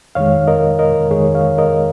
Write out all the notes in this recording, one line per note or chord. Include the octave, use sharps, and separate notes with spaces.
F2 D#3 G#3 C#5 F5
A#4 D#5
A#4 D#5
F2 D#3 G#3 G#4 C#5
C#5 F5
A#4 D#5